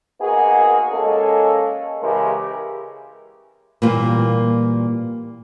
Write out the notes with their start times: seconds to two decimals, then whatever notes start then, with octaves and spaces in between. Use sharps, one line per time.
0.21 A#3 B3 D#4 F#4 G#4
0.92 G#3 A#3 C#4 A4
2.02 C#3 E3 G#3 E4 G4 A#4
3.82 A#2 E3 G3 A#3 F4